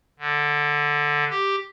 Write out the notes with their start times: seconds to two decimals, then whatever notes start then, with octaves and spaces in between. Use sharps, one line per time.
0.19 D3
1.30 G4